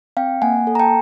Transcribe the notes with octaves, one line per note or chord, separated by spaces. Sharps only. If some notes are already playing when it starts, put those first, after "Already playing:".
C4 F5 G5
A#3 F#5 G#5
A4
A#5
G5 A5